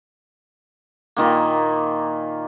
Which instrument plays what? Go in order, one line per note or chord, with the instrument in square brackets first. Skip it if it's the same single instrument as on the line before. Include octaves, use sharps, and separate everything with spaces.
[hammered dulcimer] A#2 D#3 A#3